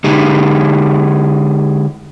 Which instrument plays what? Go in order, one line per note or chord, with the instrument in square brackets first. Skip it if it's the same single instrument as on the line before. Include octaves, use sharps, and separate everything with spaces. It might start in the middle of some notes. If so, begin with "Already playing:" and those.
[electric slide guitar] D3 G#3 D#4 G4 G#4